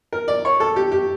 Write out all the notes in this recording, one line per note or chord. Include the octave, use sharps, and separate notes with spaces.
A#4
D5
C#5
A4
G4
G4